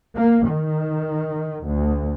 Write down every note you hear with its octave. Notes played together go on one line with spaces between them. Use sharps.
A#3
D#3
D2